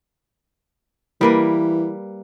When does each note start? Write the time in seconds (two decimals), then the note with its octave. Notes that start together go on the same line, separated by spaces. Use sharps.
1.21 E3 G3 A#3 B4